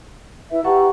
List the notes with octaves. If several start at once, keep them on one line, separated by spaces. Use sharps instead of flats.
E4 B4 E5
G4 B4 F#5 A5 A#5 C#6